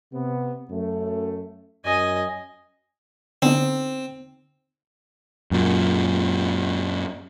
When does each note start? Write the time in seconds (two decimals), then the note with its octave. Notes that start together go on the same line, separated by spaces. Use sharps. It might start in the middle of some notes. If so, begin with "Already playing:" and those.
0.13 C3 B3
0.70 F#2 A3
1.85 F#2 D#5 G#5
3.42 D3 B3 C4 D#4
5.51 F#2 A#2